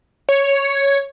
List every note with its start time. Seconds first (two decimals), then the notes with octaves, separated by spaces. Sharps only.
0.29 C#5